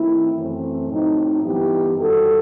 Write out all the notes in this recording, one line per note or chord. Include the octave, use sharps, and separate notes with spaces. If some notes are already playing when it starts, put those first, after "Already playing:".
Already playing: D#3 A3 C4 E4
F#2 E3 A3 C4
A2 F#3 C4 D#4
G2 E3 B3 D#4 E4 G4
F#2 D#3 G3 F#4 A4